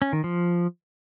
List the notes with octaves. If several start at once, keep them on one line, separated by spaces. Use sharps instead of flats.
C#4
D#3
F3